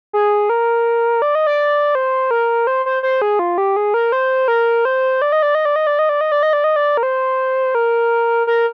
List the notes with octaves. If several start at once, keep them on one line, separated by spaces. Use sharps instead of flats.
G#4
A#4
D5
D#5
D5
C5
A#4
C5
C5
C5
G#4
F4
G4
G#4
A#4
C5
A#4
C5
D5
D#5
D5
D#5
D5
D#5
D5
D#5
D5
D#5
D5
D#5
D5
D#5
D5
A#4
C5
A#4
A#4